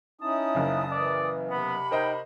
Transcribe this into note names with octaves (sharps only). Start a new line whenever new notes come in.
C#4 D#4 E4 E5 A5 D#6
F#1 C#3
E3 D5
C3 B3 F#5 B5
D#4 A#4 C5 D#5 G5